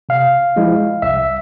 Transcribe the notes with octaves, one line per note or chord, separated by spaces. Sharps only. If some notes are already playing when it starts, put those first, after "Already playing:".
C3 F5
F3 G#3 E4
C2 E5